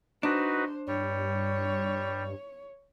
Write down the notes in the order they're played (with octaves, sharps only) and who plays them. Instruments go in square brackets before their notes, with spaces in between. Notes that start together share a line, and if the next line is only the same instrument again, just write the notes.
[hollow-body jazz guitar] D4 [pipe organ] D#4 F#4 B4 [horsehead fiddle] C5
[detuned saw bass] G2 [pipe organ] G3 [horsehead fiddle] C#5